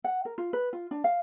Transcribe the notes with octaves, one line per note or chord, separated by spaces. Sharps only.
F#5
A#4
F4
B4
F4
D4
F5